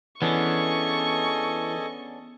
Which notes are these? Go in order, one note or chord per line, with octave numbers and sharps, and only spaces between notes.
E3 B3 C#4 D4 G#4 A4 D#5 C#6